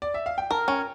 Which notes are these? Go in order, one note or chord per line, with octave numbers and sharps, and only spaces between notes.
D5
E5
F5
G5
A#4 A5
C#4 G5